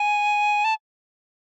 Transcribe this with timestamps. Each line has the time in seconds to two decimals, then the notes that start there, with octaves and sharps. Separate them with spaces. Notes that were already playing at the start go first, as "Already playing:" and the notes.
Already playing: G#5
0.64 A5